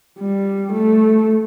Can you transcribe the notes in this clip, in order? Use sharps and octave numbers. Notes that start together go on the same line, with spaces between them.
G3
A3